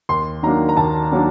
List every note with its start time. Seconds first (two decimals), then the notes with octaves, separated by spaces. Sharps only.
0.09 D#2 C6
0.43 D#3 F#3 A#3 D4 A#5
0.69 A#5
0.77 D#2 A5
1.12 D#3 F#3 A#3 D4